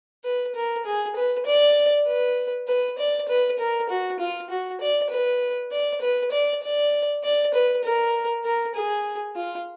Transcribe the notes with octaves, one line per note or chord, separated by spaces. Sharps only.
B4
A#4
G#4
B4
D5
B4
B4
D5
B4
A#4
F#4
F4
F#4
D5
B4
D5
B4
D5
D5
D5
B4
A#4
A#4
G#4
F4